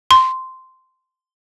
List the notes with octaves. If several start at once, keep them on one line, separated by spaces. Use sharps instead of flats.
C6